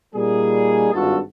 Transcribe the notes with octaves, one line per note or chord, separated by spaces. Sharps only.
A#2 G3 A#3 D#4 G#4
G#1 G2 F4 F#4 A4